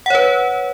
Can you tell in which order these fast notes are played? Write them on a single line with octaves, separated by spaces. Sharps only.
F#5 C#5 B4